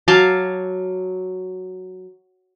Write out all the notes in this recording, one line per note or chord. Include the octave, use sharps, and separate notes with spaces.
F#3 F5 A5 D6